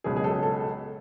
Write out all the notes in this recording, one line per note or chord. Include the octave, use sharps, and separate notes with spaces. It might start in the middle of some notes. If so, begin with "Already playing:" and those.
C#2 B2 F#3 G#4
G#4
A4
A4